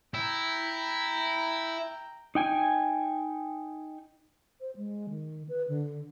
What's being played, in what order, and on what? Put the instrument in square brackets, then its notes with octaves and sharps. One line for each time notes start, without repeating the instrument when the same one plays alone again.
[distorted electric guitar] E4 [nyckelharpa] G5 A#5
[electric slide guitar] D#4 G5 G#5
[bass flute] C5
G#3
D#3
B4
D3